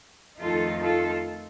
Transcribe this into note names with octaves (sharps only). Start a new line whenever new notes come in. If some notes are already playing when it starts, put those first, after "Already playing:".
F2 D#3 A3 D#4 F4 A4
F4 A4